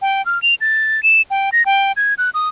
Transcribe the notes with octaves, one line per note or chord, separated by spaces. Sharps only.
G5
F6
F7
A6
E7
G5
A#6
G5
G#6
F#6
D#6